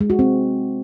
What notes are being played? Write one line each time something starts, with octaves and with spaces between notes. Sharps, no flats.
G#3
F#4
C4